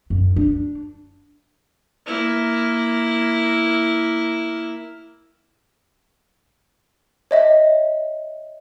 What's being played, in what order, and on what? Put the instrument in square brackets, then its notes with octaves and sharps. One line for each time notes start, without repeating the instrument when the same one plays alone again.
[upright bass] F#2
D4
[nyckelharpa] A#3 E4
[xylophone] C#5 D#5 E5